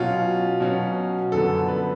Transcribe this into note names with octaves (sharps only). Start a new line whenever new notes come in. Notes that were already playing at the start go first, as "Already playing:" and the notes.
Already playing: B2 F#3 C#4 F4
B2 F#3 C#4
F#2 D3 F3 B3 A4
B4